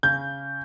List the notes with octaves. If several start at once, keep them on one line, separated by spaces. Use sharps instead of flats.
C#3 G6